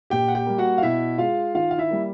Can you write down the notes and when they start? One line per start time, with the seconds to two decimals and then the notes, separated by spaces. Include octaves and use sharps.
0.10 A#2 G4 G5
0.28 F#5
0.35 G4 G5
0.46 G3 A#3
0.58 F#4 F#5
0.78 F5
0.82 B2 E4 E5
1.18 G#3 F4 F5
1.54 D#3 F4 F5
1.71 F5
1.78 E4 E5
1.91 G3 A#3